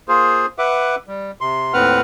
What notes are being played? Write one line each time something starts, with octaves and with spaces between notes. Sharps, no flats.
A#3 F4 G#4 C5
B4 E5 F#5 D6
G3
C3 C6
D#2 A2 C4 B4 F#5 F6